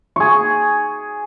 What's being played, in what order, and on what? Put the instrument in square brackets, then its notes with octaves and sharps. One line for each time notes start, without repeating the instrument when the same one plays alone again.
[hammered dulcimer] G#4 C#6